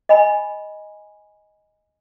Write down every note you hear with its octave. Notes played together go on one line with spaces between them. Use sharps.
D#5 G#5 B5